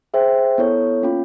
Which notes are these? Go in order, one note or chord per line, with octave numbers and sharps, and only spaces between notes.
G#4 C5 E5 G5
B3 E4 A4 C#5
A#3 C#4 F4